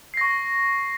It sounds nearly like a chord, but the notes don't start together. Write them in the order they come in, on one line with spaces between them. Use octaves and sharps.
C7 A#6 C#6